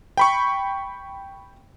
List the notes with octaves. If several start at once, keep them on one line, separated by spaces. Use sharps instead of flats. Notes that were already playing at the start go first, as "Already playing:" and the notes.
G5 B5 C#6